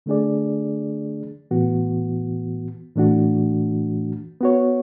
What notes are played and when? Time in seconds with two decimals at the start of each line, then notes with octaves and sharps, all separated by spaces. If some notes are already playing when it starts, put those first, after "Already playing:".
0.06 D3 A3 D4 G#4 D5
1.51 A2 E3 B3 F#4
2.96 A2 E3 A3 D4 F#4
4.41 B3 F#4 C#5